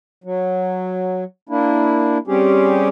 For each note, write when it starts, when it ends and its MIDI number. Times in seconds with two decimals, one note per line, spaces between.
0.24 1.24 54
1.49 2.18 58
1.49 2.18 62
1.49 2.18 64
2.27 2.89 55
2.27 2.89 60
2.27 2.89 61
2.27 2.89 67
2.27 2.89 68